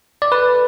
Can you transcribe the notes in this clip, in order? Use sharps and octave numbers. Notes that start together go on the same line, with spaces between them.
D5
A4 B4